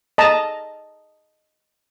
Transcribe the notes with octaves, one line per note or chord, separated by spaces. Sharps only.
D#5 A5 A#5